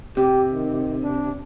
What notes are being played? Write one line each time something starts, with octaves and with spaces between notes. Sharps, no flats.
C3 G4
D#3
D4